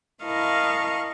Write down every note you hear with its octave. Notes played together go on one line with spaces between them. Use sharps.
E4 A#4 D#5 F5 A5 C#6